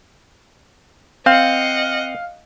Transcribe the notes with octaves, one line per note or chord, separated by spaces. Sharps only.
C4 D#5 F5 F#5